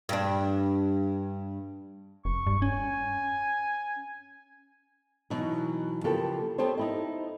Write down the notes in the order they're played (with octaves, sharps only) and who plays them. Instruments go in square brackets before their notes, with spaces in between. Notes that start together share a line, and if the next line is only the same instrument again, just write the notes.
[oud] G2 D4
[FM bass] F1 [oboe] C#6
[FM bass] G2
[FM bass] C#4 [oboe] G#5
[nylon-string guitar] B2 E3 F#3 D#4
C#3 F3 A#3 B3 G4 A4
B3 G4 A4 C5 C#5
D#4 E4 D#5